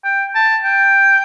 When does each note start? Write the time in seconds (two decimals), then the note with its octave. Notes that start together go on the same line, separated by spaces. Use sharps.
0.04 G5
0.35 A5
0.64 G5